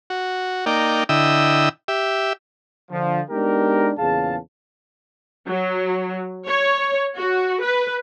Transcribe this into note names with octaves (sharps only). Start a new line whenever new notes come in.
F#4
A#3 D#4 D5 G5
D3 E4 D#5 G5 E6
G4 E5
D3 F3
G#3 B3 D4 D#4 G4 A#4
E2 A#2 C#3 G#4 F5 A5
F#3
C#5
F#4
B4